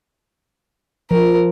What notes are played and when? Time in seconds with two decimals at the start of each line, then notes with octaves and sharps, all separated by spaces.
1.11 F3 A#4